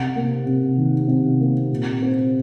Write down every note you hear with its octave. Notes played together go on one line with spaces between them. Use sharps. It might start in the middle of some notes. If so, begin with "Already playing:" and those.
Already playing: C3 F#5
A#3
C3
D#3
C3
A#3
A#2
C4